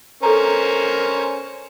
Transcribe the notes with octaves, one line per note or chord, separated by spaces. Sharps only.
C#4 A4 A#4 C5 A#5